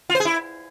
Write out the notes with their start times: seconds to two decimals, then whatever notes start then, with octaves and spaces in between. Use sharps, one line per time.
0.10 F4
0.15 C5
0.20 G#4
0.25 E4